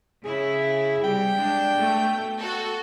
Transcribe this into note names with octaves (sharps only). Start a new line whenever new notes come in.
C#3 E4 G#4
C3 G3 G5
G#3 D4
B2 A3
F#4 A4